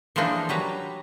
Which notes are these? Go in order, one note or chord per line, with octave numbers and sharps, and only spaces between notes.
E3 F3 G#3 A#3 D4 D#4
F#3 G3 B4 A#5